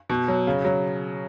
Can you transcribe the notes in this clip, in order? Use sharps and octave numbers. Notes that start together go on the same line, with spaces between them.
B2
F#3
C#3
F#3